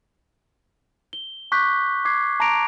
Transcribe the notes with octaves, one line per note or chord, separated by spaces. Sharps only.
G7
C#6 D6 F#6 G6 B6
D6 G#6 C7
A5 A#5 D6 A#6 D7 F7